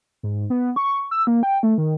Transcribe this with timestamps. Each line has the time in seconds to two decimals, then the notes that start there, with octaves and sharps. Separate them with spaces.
0.23 G#2
0.50 B3
0.76 C#6
1.11 E6
1.27 A#3
1.43 G5
1.63 A3
1.78 D#3